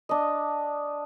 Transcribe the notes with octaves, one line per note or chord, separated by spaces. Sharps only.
D4 D#5